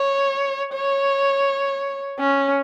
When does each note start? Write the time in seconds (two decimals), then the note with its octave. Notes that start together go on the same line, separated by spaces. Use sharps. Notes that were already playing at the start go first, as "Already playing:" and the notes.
Already playing: C#5
0.73 C#5
2.20 C#4